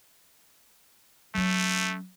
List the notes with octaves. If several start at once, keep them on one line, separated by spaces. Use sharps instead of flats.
F#3 A3 C#4